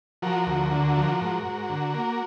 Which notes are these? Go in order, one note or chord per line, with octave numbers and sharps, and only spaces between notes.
F3 F#4 A#4
D2
D3
F3
G#2
G#2
D3
A#3